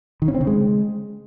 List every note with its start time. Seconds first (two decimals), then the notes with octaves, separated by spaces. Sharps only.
0.22 D#3
0.28 C#4
0.34 C4
0.41 C#3
0.47 G#3